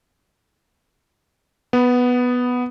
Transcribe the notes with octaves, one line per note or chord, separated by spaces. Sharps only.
B3